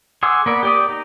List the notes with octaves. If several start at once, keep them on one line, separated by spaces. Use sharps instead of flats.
G#4 F#5 C6 D6 E6
A#3 B3 D5
G4 D5 D#6
D#4